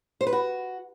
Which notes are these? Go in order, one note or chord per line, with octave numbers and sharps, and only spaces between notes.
C5
B4
F#4